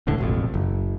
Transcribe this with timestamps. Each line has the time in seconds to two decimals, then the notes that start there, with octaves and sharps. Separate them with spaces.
0.07 E1 C#2 A2 D3
0.18 E1 A1 F2
0.54 F#1